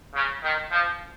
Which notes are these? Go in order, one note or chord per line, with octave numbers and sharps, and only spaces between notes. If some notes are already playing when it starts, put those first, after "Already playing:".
C#3
D#3
F3